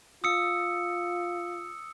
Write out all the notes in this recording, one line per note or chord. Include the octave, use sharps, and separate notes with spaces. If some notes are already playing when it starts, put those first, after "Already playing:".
F4 D#6 E6 C#7